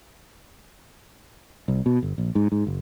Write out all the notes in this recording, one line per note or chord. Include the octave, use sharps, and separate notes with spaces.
C2
B2
G1
A#1
G#2
G#2
F#1